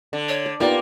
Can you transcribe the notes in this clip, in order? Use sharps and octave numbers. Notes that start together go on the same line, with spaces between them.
D3
C#5
D5
A#3 B3 D#4 F4 G4 D5